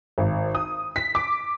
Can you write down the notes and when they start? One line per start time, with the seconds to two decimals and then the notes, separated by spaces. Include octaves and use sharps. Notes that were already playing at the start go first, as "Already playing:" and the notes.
0.18 G#1
0.55 D#6
0.96 B6
1.15 D6